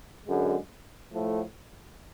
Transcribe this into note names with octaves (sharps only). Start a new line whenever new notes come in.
F#2 D3 G#3
A2 F3 A3